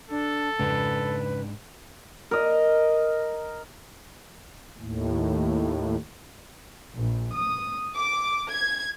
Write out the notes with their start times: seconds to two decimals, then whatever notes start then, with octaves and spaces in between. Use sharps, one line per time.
0.10 D4 A4
0.59 F2 G#2 C#3 D4 B4
2.31 A#4 D#5
4.78 D#2 A2
6.96 A#1
7.34 D#6
7.94 D6
8.49 G#6